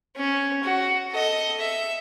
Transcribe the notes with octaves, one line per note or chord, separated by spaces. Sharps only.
C#4
F#4
A4 D#5
E5